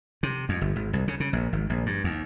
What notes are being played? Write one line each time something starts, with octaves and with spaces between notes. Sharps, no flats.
C3
F2
G1
G#1
C2
C#3
C#3
A#1
G#1
A#1
G2
D#2